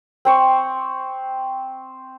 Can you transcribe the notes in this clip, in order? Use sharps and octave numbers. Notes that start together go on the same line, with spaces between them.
C4 C5 C#6